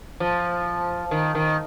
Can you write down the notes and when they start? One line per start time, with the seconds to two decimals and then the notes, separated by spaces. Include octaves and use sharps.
0.20 F3
1.11 D#3
1.35 D#3